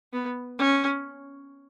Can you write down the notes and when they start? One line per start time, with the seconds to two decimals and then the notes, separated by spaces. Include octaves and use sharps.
0.13 B3
0.59 C#4